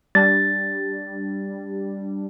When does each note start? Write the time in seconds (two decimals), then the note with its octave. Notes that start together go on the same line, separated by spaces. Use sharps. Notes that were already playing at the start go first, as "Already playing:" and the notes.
0.15 G3 D4 A6